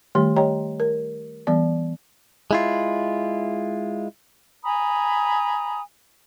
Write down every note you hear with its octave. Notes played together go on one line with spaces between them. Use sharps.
D#3 G3 A3 G4 C6
G4 C#5 D#5 G5 A#5
A#4
E3 G3 B3 D5
G#3 E4 F4
G#5 A#5 B5 D#6